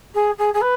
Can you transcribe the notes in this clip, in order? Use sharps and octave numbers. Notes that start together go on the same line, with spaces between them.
G#4
G#4
G#4
B4